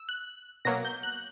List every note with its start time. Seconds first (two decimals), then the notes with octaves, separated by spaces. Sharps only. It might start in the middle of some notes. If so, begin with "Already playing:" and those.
Already playing: E6
0.09 F#6
0.65 B2 F#3 A#3 A#6
0.85 G6
1.03 F#6